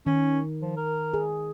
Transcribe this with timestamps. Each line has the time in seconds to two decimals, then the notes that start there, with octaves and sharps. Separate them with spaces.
0.06 D#3 C#4
0.62 F3
0.77 A#4
1.14 G#4